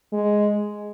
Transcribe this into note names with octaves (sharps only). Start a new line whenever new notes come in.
G#3